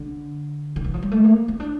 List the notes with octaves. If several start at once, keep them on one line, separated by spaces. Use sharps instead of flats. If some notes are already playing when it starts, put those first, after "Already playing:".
Already playing: D3
D3
E3
F3
G3
A3
A#3
C4
D4